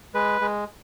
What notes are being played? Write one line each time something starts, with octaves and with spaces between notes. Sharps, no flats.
G#3 B4
G#3